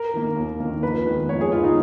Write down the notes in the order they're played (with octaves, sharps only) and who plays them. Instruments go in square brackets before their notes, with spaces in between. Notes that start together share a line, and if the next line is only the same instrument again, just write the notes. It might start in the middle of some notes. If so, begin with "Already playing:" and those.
Already playing: [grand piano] A#4
D#3 A#3
D#2
D#3 A#3
F2 B4
D#3 G#3 B3
F2 C#5
G#4
D#3 G#3 B3 F4
D#4